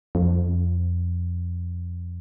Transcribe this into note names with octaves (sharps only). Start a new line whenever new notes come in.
F2